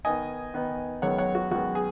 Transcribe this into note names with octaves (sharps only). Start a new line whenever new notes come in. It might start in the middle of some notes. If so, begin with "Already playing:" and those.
D#3 B3 D#4 D#5 G#5
D#3 B3 D#4
F#2 D#3 G#3 B3 C#5 F#5
C#5 F#5
F#4
F#2 D#3 G#3 B3 F#4
G#4